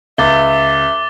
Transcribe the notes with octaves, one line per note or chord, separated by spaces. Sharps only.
C#2 E5 D6 A6 G7